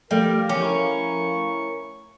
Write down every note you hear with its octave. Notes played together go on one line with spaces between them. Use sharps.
F3 G3 A3 A#4 F5
E2 C#4 G4
E4 A#4 C#6